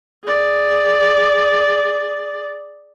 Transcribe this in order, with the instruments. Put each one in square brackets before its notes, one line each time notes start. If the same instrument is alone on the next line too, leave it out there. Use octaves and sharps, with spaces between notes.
[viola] G#4 D5